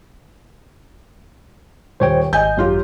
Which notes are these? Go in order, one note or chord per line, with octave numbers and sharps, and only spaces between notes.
D#1 C5 C#5 G5
G#1 D#5 G#5 G6
F#2 F4 G4